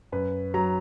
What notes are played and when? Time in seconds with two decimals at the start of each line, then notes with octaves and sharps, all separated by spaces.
0.12 F#2 B4
0.54 F#3 A#5